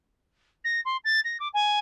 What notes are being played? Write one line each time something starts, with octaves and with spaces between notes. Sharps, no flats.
A#6
C6
A6
A#6
D6
G#5